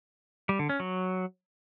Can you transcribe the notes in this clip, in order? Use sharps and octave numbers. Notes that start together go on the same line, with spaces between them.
G3
D3
C#4
F#3